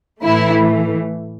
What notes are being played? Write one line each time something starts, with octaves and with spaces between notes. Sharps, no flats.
A2 E3 A3 E4